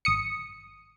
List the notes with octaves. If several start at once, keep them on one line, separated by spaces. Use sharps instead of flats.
G#1 D#6 C#7